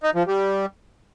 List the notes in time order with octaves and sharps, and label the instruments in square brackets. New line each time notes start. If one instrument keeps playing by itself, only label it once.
[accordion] D#4
F3
G3